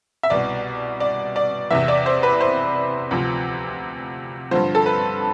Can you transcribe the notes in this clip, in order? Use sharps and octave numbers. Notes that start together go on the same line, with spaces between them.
E5
C2 B2 D5
D5
D5
E2 C3 E3 E5
D5
C5
B4
C5
D2 C3 F3
G2 D3 F3 C5
A4
B4